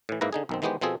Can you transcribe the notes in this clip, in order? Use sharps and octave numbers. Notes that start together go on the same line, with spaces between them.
A2 E3
G#2 A#3 E4 B4 A#5
D3 D#4 G#4
B1 D#3 C4
D#3 E3 G#3 B3 G4 C5
B2 F3 C4 G#4 A4